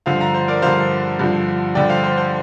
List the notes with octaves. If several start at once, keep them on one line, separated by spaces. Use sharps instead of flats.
G2 D3 F3 C5 F5
F5 A#5
C5
A#4 D5
G2 D3 F3 C5 F5
G2 D3 F3
G2 D3 F3 D5 G5
C5 F5
C5
C5